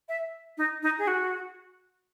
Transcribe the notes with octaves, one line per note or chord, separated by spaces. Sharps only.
E5
D#4
D#4
G#4
F#4